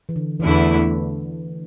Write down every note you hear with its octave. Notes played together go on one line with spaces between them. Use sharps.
E3
D3
E2 D3 E3 A3 E4